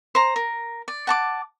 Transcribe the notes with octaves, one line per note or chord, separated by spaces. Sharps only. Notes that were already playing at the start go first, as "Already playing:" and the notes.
C5 A#5
A#4
D5
F#5 A5 D6